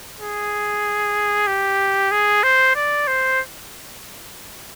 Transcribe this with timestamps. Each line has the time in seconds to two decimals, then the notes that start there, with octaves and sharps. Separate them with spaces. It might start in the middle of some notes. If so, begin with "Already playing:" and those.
0.19 G#4
1.47 G4
2.11 G#4
2.43 C5
2.76 D5
3.07 C5